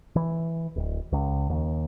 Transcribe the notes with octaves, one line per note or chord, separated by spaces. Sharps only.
E3
D1
C#2
D#2